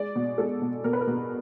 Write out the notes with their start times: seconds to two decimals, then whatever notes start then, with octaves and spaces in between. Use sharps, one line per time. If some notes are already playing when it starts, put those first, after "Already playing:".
Already playing: G#3 D5
0.16 B2
0.38 G#3 A4
0.62 B2
0.84 B2 A#4
0.93 B4
1.01 A#4
1.07 B2